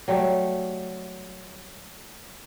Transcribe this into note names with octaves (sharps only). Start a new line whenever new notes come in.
F#3 G3 A3